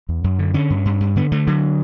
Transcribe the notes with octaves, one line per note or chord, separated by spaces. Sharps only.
E2
F#2
D3
D3 C#4
G2
G2
G2
D3 B3
D3 A3
D3 F#3